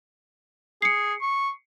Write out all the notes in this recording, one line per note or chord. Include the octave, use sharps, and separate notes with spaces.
G#4 C7 C#7
C#6